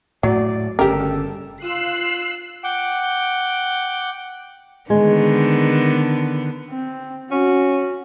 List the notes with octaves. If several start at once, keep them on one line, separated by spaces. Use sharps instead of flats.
A2 F#3 A3 D5
G1 C#3 C#4 G4 A4 A#4
F4 E6 F#6 C7
F#5 G5 D6
D3 D#3 G#3 B3
C4
C#4 F#4